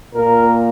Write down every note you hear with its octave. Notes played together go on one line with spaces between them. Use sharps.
A#2 A#3 A#4